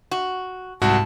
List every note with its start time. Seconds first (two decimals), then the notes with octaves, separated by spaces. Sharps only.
0.11 F#4
0.82 C2 G#2 F#4 A5